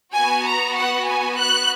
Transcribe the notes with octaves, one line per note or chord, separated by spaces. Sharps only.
B3 F#4 G#5
A#5
F#5
G#5
F#6